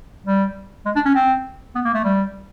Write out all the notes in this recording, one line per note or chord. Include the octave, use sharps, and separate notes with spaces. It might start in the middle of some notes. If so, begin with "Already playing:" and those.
G3
G#3
D4
C#4
C4
B3
A#3
A3
G3